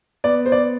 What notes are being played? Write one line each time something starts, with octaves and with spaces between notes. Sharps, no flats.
B3 D5
C5
D5